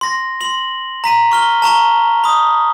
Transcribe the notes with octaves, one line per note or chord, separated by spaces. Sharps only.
C6 A#6
C6 F#7
A#5 B6 D#7
C#6 F6 G7
A5 A#5 C#6 G7
B5 D#6